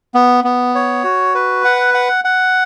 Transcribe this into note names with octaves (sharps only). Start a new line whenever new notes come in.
B3
B3
C#5
F#4
B4
F#5
F#5
F#5